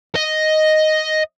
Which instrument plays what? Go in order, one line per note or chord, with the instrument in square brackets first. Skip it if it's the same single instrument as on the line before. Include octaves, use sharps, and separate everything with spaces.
[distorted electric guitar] D#5